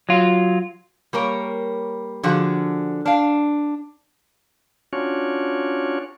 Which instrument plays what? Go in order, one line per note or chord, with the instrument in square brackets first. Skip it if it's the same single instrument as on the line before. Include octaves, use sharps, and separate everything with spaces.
[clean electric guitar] F#3 F4
[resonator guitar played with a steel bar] G3 A#3 A#4 C#5
D3 F3 F#4 G#4
D4 F5
[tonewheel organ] C#4 D4 F4 F#4 C#5